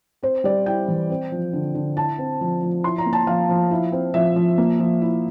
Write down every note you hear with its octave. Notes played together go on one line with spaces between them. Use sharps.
C4 C5
G3 D5
E4 G5
E3
C4
F3
D3
D3
E4 A5
C4
F3
F3
E4 C6
A#5
A#3
A5
F3 F5
F3
E4
C4
F3 E5
F3
A#3
F3
E4